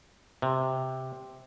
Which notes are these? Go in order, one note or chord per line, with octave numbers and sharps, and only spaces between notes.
C3